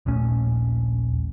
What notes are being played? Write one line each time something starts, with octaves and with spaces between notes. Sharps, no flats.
D#1 A#1 A3 C#4